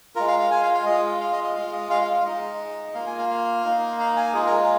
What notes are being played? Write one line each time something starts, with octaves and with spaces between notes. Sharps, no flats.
G#3 F4 A#4
F5
F5
G#5
F5
F5
G#3 F4 D#5
F5
D#5
D#5
G#3 F4 F5
D#5
F5
F5
F5
G#3 D#4 D#5
A#3 F4 F5
G#5
F5
F5
A#3 D#4
F5
G#5
G#3 F4 G#4
A#4